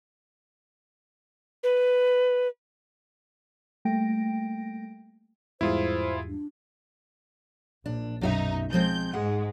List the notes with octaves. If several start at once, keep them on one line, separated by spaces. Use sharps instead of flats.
B4
G3 A3 A#3 G5 A#6 D7
E2 G#2 G3 E4 F4 G#4 C5
D4
A#1 D4
B1 F#2 D#4 F#4 E5
F3 G#3 C4 G6
G#2 G#3 F#5